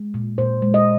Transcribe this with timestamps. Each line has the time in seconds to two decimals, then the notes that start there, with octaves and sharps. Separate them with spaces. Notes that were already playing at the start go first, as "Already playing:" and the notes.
Already playing: G#3
0.14 A#2
0.38 A#2 C5
0.62 G#3
0.74 D#5